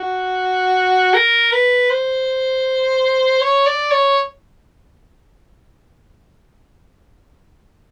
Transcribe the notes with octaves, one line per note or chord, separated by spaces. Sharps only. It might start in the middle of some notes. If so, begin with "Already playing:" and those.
Already playing: F#4
A#4
B4
C5
C#5
D5
C#5